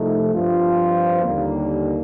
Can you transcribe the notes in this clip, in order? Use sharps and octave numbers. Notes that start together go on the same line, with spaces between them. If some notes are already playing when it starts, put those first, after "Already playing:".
Already playing: C2 C3 F3 A3 D#4
G2 F3 C4 F4
D#2 D3 G3 A#3